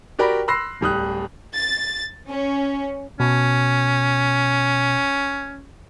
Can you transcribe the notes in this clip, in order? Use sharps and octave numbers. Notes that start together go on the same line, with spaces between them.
F#4 G4 A#4 D5 G5 B5
B5 C6 E6 F#6 A#6 C7
D1 G3 D#6 F#6
A6
C#4
B2 C#4